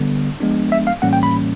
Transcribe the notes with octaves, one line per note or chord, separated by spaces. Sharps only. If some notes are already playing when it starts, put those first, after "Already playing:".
Already playing: D3 G3 B3
F3 G#3 B3 D4
E5
F5
A2 E3 G3 A#3 C#4 F#5
G5
B5